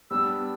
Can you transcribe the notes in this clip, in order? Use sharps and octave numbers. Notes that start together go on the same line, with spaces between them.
G3 B3 D4 E6